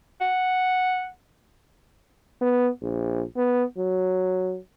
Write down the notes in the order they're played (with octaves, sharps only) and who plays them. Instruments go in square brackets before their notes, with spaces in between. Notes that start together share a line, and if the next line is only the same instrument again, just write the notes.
[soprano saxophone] F#5
[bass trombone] B3
A#1
B3
F#3